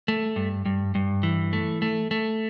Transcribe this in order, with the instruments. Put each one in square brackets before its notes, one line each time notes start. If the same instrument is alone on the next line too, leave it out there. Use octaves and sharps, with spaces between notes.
[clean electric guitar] A3
G2
G2
G2
E3
A3
A3
A3